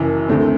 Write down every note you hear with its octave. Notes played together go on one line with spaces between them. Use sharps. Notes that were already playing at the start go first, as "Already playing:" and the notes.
Already playing: F#1 F#2 E3
D2 D3 A3 C4